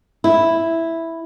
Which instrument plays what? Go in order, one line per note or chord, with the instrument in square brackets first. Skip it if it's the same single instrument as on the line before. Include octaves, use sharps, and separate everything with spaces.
[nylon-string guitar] E4